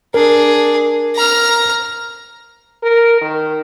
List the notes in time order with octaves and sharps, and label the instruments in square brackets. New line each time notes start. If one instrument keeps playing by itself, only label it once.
[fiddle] D4 G#4 [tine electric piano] A#4
[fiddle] A#5 F6
[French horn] A#4
D#3